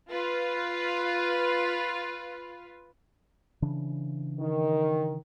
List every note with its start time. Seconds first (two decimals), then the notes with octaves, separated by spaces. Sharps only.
0.11 F4 B4
3.62 C#3 E3 D4
4.40 D#3